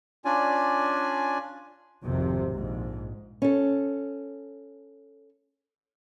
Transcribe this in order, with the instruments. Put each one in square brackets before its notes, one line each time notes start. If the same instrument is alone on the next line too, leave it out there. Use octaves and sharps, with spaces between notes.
[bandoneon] C#4 D4 F4 D5 G#5
[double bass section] G#1 F2 C3
A#1 G#2
[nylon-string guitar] C#4 A4